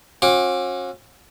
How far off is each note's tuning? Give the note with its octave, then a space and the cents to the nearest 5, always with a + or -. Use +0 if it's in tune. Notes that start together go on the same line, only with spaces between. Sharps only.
C#4 -45 F#4 -45 D6 +0